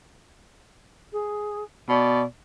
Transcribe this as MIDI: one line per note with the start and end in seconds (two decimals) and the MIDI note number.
1.12 1.62 68
1.89 2.23 47
1.89 2.22 74